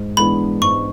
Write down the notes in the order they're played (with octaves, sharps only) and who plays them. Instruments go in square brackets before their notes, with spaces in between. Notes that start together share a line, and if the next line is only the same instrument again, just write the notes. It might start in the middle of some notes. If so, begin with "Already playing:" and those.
Already playing: [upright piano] G#2
[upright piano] E3 G#3 B3 D4 [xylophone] B5
[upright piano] G#2 [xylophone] C#6